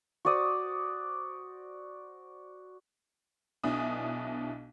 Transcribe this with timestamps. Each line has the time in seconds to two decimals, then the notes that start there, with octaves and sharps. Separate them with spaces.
0.25 F#4 C5 D5 D#6
3.64 B1 B2 D4 E4 G#5 D#6